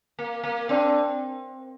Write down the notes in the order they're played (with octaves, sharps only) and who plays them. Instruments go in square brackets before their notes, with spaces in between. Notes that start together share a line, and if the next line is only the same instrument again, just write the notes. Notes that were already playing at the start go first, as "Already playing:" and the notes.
[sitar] A#3
A#3
[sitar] C4 [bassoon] D4